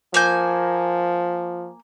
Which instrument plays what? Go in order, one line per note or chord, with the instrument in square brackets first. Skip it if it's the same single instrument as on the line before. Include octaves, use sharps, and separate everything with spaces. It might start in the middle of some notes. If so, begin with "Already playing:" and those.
[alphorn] F3 [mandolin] A#3 G#5 G6